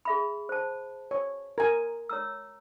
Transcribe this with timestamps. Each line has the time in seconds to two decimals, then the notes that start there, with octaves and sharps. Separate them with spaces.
0.05 G#4 E5 B5
0.49 C5 A5
1.11 C#5
1.58 F#4 A#4 G#5
2.09 C#5 A#5 E6